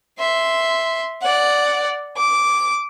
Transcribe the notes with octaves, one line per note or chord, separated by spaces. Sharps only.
E5 C6
D5 F#5
D6